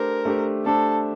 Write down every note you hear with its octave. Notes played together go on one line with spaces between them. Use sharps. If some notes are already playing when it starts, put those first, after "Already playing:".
Already playing: A3 D4 G4 A#4 C5
A3 D4 G4 C5
A3 D4 G4 A4 C5